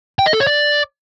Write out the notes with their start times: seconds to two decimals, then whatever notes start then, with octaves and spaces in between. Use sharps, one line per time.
0.19 G5
0.26 D#5
0.33 A4
0.40 C#5
0.47 D5